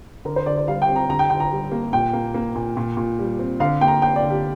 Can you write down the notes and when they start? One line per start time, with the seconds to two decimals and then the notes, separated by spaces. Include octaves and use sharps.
0.25 D3 A#4
0.36 C5
0.46 D3 D5
0.57 D5
0.67 G3 F5
0.82 G5
0.89 C4
0.96 A#5
1.09 D3 A#5
1.19 G5
1.30 D3 G5
1.40 A#5
1.51 G3
1.72 A#3
1.93 A#2 G5
2.13 A#3
2.34 A#3
2.55 A#2
2.77 A#2
2.97 A#2
3.19 G3
3.39 C4
3.60 D3 F5
3.81 A#3 G5
3.88 A#5
4.02 A#3 G5
4.16 D5
4.23 D3
4.30 G4